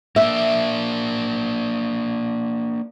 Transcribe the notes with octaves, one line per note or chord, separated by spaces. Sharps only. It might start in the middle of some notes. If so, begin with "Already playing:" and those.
A#3 D4 E5